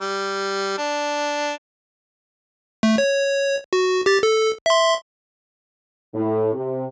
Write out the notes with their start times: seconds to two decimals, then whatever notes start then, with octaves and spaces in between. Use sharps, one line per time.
0.01 G3
0.78 D4
2.83 A3
2.98 C#5
3.73 F#4
4.06 G4 A6
4.23 A4
4.66 E5 C6
6.14 A2
6.54 C3